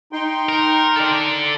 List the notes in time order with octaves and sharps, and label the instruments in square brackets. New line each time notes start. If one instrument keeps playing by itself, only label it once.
[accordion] D#4 G5 C6
[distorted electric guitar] A#4
A4 D5